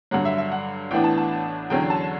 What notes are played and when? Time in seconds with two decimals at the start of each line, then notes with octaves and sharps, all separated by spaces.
0.11 G2 D3 F#3 F#5
0.25 E5
0.38 E5
0.52 F#5
0.91 A1 A2 E3 B3 D4 G5
1.04 A5
1.18 A5
1.70 E2 D3 F#3 C#4 G5
1.90 A5